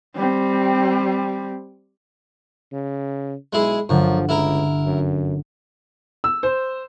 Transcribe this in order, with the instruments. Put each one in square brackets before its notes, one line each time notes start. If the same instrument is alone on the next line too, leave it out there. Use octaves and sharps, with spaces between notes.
[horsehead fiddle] G3 C4
[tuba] C#3
[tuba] B1 [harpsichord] G#3 E4 G#4
[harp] G1 D3 [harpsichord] F#2 [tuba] F3
[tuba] C#2 [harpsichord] E4 A#4
[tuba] F#2
[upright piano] E6
C5